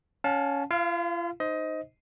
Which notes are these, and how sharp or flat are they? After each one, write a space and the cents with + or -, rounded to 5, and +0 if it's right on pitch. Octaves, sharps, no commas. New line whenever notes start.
C#4 +10 F5 +40 A5 -10
F4 -40 F5 +0
D#4 -10 C5 -5 D#5 +20